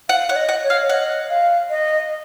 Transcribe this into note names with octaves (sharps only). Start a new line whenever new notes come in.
F5 F#5
C#5 F#5
D#5
F#5
C#5
F5
D#5 F#5
F5
D#5